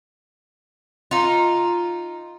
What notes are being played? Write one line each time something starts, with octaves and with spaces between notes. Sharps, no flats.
D#4 F4